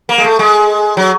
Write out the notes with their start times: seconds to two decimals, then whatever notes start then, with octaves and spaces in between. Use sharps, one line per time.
0.09 A#3
0.18 G#3
0.24 A3
0.39 G#3
0.97 F#3